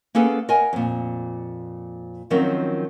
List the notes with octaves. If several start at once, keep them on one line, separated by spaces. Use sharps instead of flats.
A#3 B3 C#4 G#4 A4 B4
A#4 D#5 F#5 G#5
F2 A#2
D#3 F3 F#3 C4 C#4 A#4